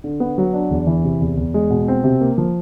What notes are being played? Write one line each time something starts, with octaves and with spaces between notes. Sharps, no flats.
D3
B3
F#3
D4
E2
E3
C3
E2
E2
G#3
B2
C4
C3
A#3
F3